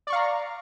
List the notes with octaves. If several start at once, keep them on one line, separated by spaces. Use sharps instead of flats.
D5 F5 A#5 C#6